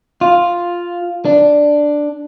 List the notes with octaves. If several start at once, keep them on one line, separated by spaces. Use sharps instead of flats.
F4
D4